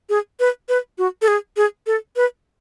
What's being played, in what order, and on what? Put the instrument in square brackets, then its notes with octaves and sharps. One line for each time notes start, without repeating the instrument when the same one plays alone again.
[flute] G#4
B4
B4
F#4
A4
G#4
G#4
A4
B4